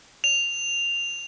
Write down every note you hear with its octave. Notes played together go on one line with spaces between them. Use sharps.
F7